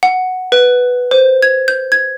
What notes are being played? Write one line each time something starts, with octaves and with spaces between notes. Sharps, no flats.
F#5
B4
C5
G#6
G6
G#6